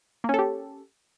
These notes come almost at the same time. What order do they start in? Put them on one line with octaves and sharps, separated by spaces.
A#3 C#4 A4 G4